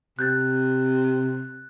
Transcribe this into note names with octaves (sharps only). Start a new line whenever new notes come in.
C3 F#6 G6 A6